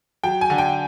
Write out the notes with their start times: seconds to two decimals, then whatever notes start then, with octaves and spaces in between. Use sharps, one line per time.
0.24 F#3 G5
0.41 G#5
0.50 D3
0.58 G5